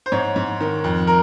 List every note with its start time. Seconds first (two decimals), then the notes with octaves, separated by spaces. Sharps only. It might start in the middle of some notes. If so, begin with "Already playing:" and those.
0.06 C5
0.12 G#2 C#5
0.36 G#2
0.61 D#3
0.84 F2
1.07 A#4